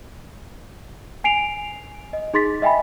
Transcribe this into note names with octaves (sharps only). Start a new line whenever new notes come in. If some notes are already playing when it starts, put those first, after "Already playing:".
G#5 C7 D7 F7
D#5
D#4 G#4 C6 A6 B6
D#5 E5 G5 G#5 B5